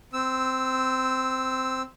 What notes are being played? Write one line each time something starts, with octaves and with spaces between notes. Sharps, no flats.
C4 E6